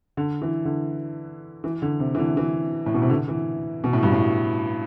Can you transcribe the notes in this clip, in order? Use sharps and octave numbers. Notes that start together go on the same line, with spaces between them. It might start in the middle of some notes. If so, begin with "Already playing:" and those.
D3
E3
D3
E3
D3
C3
E3
D3
E3
A2
B2
C3
D3
E3
B2
A2
G2
A2